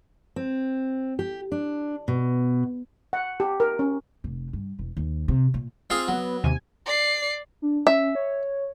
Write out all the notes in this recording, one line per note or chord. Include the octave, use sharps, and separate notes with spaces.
C4
G4
D4
B2
F#5
G4
A#4
C#4
F1
G2
E1
D#2
C3
A#2
C4 F4 G#4 F5
F#3 B3
D#2 C3 G#5
D5 C7
D4
C#4 E5
C#5